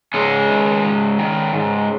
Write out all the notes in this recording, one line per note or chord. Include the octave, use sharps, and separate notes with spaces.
G#2 G#3 C#4
D#3
G#2
D#3
G#2